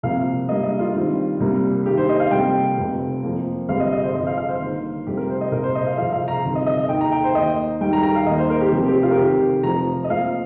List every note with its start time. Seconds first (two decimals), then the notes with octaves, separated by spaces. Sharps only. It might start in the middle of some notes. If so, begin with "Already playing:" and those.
0.03 C2 C3 F3 A#3 F5
0.49 G2 G3 A#3 D#5
0.63 D#5
0.79 F4
0.94 G2 D#3 G3 C4
1.40 C2 C3 G3 A#3
1.85 G2 D#3 A#3 G4
1.97 C5
2.09 D#5
2.20 F5
2.31 F2 C3 G3 A#3 G5
2.77 F1 F2 C3
3.23 F2 F3 A#3
3.69 G1 F2 C3 G3 F5
3.80 D#5
3.92 D#5
4.03 C5
4.14 G1 F2 F3 D#5
4.27 F5
4.38 F5
4.48 C5
4.61 G1 G2 D#3 A#3
5.06 F1 F2 C3 G3 C4 G4
5.17 A#4
5.30 C5
5.41 D#5
5.52 C2 A#2 A#3 A#4
5.64 C5
5.75 D#5
5.87 F5
5.97 C2 C3 F3 F5
6.13 F5
6.28 A#5
6.44 G1 F2 C3 D#3
6.55 D#5
6.66 D#5
6.78 D#5
6.89 D#2 D#3 A#3 G5
7.01 A#5
7.12 G5
7.24 C5
7.35 D#2 D#3 A#3 D#5
7.80 D#2 D#3 G3 G5
7.93 A#5
8.03 A#5
8.16 F5
8.26 D#2 D#3 A#3 D#5
8.38 C5
8.50 A#4
8.61 G4
8.72 F1 F2 C3 F3 G4
8.88 G4
9.03 F4
9.11 A#4
9.17 F2 C3 D#3 C4 G4
9.63 F1 F2 F3 A#5
10.04 D#5
10.10 F2 F3 A#3 F5